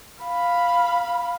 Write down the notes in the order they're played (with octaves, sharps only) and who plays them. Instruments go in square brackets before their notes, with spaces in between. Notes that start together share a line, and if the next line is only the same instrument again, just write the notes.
[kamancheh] F5 B5